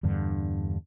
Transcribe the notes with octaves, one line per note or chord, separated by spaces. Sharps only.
E2 G2 D3